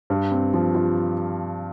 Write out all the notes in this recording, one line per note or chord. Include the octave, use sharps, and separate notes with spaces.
G2
C4
F3
F4